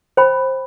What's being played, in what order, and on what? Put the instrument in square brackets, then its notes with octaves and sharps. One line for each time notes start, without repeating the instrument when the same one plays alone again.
[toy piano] C5 G5 B5